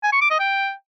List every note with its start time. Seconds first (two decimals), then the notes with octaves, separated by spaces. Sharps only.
0.03 G#5
0.12 C#6
0.21 D6
0.30 D#5
0.40 G5